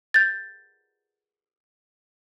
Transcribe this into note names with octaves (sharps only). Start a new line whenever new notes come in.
G6 A6